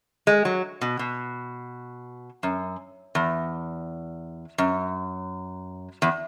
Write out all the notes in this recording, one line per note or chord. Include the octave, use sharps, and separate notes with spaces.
G#3
F#3
B2
B2
F#2
E2
F#2
E2